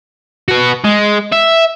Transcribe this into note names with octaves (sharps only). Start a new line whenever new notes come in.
F#4 B4
G#3
E5